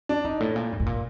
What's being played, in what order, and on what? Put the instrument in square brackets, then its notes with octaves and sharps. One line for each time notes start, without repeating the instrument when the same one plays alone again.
[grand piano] D4
[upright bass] G2 [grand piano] D#4
[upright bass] A2
A#2
G2
A2
A#2